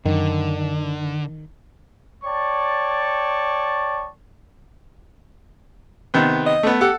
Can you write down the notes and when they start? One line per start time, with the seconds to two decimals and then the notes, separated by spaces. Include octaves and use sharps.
0.05 F#2 D3 D#3
2.24 C#5 D5 G5 A5 C#6
6.14 C3 D#3 B3
6.46 D#5
6.63 A3 B3
6.81 G4 A4 F#5